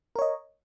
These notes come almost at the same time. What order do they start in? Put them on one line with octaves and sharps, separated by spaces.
A#4 C#5 D#5